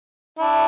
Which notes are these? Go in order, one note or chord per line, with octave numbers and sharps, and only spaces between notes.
D4 E4